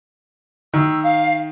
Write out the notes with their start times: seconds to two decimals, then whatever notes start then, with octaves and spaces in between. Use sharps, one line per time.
0.74 D#3 E6
1.03 F5